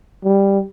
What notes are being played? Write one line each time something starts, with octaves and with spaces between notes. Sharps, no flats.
G3